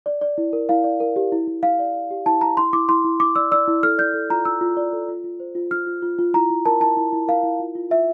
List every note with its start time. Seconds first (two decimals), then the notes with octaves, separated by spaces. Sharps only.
0.06 D5
0.21 D5
0.38 E4
0.53 A#4
0.69 E4 F5
0.84 D5
1.00 A#4
1.16 G4
1.32 E4
1.47 E4
1.63 E4 F5
1.79 D5
1.94 D5
2.11 G4
2.26 E4 A5
2.41 E4 A#5
2.57 E4 C6
2.73 E4 D6
2.89 E4 C6
3.05 E4
3.20 E4 D6
3.36 D5 E6
3.51 D5 E6
3.68 E4
3.83 A4 F6
3.98 D5 G6
4.14 A4
4.30 F4 A#5
4.45 F4 E6
4.61 F4
4.77 D5
4.93 A4
5.09 F4
5.24 F4
5.40 C5
5.55 F4
5.71 F4 F6
5.87 F4
6.02 F4
6.19 F4
6.34 E4 A#5
6.50 E4
6.65 A#4 A5
6.80 E4 A5
6.97 E4
7.13 E4
7.28 A#4 F5
7.43 E4
7.60 F4
7.75 F4
7.90 F4 E5